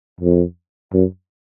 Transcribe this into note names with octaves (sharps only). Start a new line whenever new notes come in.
F2
F#2